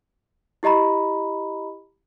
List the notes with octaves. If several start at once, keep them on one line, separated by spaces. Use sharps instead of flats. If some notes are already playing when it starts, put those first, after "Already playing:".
E4 G4 D#5 A#5 B5